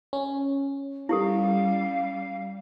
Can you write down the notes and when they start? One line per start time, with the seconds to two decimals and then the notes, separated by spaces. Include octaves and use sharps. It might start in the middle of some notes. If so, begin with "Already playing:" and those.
0.13 C#4
1.09 G3 E4 G4 A4 F5